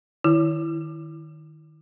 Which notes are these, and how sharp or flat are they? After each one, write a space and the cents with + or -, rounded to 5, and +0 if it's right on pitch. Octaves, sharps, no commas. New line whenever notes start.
D#3 -15 E4 +0